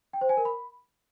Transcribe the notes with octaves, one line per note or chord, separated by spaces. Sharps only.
G5
C5
G#5
A#4
B5